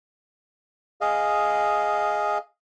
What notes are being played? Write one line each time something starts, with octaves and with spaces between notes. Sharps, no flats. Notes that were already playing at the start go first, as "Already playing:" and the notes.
G#4 D#5 F5